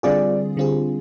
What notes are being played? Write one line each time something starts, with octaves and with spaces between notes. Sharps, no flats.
D3 G3 C4 F4 G#4 D5
D3 G3 C4 F4 G#4